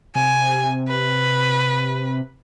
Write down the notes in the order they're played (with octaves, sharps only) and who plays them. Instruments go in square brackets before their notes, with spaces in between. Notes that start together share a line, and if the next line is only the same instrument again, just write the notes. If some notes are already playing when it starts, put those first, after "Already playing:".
[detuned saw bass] C3 [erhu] G#5
[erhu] B4